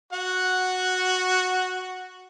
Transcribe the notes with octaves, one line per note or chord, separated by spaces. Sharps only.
F#4 F#5